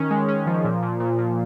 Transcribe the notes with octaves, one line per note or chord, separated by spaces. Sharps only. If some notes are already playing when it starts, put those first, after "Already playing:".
Already playing: D#3 C#4
G#3
C#4
F3
A#2
A#2
A#2
A#2